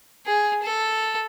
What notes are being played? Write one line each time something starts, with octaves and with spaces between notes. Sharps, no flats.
G#4
A4